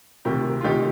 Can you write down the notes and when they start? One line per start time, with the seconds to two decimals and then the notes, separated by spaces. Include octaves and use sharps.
0.25 D2 C3 D#3 G4 A#4
0.61 F4
0.64 D2 C3 D#3 D#4 G4